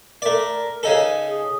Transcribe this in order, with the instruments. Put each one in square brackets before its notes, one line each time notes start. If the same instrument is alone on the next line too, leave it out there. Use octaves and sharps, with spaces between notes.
[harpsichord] A3 D5 [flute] A#4
[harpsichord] C#3 D#4 A4
[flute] G#4